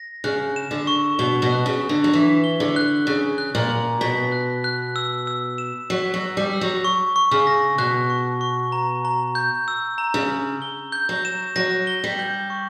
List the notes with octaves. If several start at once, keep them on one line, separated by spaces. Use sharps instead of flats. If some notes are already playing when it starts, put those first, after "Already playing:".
Already playing: A#6
C#3 F#6
E7
D3
C#6
B2 G7
B2
F#6
C#3
E7
D3
F#3
E3 B6
G7
D3
F#6
C#3 F#6
F#6
A#2
F#7
B2 B6
F#6
F#6
E6
E6
E7
F#3 B6
F#3
E6
G3
E6
F#3
C#6
C#6
C#3
A#6
B2 F#6
C#6
C#6
A#5
A#5
G6
E6
A#5
C#3
A#5
G7
G6
F#3
E7
F#3 A#6
G7
G3
G6
C#6